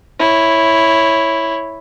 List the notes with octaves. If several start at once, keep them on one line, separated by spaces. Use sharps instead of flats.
E4 C#5